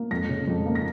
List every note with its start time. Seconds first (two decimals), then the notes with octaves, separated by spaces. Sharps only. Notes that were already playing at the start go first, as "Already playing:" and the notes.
Already playing: A#3
0.11 F2 A#6
0.29 C#3
0.47 F2
0.66 A#3
0.75 A#6